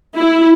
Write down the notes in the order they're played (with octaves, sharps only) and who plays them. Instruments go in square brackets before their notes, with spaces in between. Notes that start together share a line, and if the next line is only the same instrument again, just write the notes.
[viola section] E4